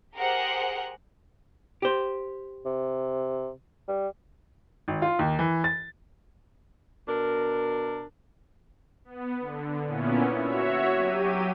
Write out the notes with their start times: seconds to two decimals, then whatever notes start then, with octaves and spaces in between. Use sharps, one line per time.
0.16 G4 G#4 A#4 C5 F#5
1.82 G4 C5
2.65 C3
3.88 G3
4.88 G#1
5.02 F4
5.19 D#2
5.39 E3
5.64 A6
7.08 B2 D4 A#4
9.05 B3
9.40 D3
9.85 A#2 B3 C#4 E4
10.32 F#4 C#5 E5
10.94 F#3 G4 D#7